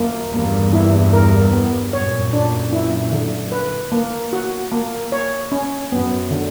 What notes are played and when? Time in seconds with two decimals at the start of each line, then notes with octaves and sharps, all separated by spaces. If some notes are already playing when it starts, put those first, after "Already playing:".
Already playing: F#2 A#3
0.33 E2 G2 A#3
0.73 E4
1.13 A#4
1.53 B3
1.93 F#2 A#2 C#5
2.33 D4
2.73 E4
3.12 D3
3.52 B4
3.92 A#3
4.33 F#4
4.72 A#3
5.12 C#5
5.52 C#4
5.92 F#2 B3
6.31 D3